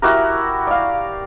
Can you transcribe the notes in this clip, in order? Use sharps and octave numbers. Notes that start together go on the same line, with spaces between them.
E4 F#4 G4 A#4
D5 F5